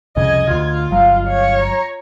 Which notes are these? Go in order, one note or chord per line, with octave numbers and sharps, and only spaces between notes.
C2 F2 C#3 D#5 G#6
D2 F4
G1 F#3 F5
C#5
A#5